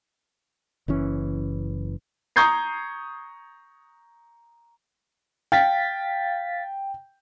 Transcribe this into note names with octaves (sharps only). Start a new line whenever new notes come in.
F#1 E3 C#4
A#5 C#6 D#6 G6 G#6 C7
F5 G5 A6 B6